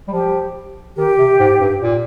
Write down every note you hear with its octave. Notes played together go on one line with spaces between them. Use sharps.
G3
F3 G4
D#3 G4
C3
G#2
G2
A#2